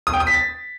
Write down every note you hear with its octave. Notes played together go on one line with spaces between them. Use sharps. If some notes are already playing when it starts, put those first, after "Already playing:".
D#6
G5
D#6
B6
A6